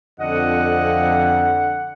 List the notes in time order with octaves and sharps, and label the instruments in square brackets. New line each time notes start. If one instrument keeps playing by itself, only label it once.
[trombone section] F2 [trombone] D3 [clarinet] D#5 [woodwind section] F#5